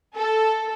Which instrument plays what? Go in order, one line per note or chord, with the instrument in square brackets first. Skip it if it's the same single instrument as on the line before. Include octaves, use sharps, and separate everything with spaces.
[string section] A4